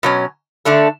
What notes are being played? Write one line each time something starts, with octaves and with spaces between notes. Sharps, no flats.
B2 F#3 C#4
D3 A3 D4 A4